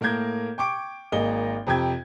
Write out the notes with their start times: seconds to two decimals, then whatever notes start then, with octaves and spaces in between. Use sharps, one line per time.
0.01 A2 A#3 A#4 G6 G#6
0.58 G5 C#6 D6 D7
1.12 G#1 A#3 G#4 D#5 G7
1.67 F2 C3 G5 G#6